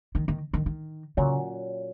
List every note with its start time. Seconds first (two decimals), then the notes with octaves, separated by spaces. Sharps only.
0.15 D#3
0.28 D#3
0.53 D#3
0.66 D#3
1.17 A#2 C#3 F#3 C#4